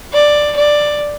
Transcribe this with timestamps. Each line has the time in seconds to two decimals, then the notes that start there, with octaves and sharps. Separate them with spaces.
0.13 D5
0.57 D5